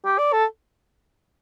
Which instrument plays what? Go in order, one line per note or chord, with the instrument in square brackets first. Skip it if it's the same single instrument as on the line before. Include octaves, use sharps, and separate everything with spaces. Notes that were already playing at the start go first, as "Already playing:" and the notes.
[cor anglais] G4
D5
A4